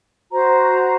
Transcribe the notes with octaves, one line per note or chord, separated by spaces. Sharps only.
F#4 C5 A#5